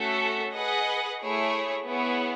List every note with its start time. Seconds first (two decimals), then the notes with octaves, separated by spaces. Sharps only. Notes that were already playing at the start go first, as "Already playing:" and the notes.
Already playing: A3 C#4 F#4 A4 E5
0.54 G#4 B4 D#5 F#5
1.21 A3 E4 G#4 C#5
1.86 B3 E4 G#4 C#5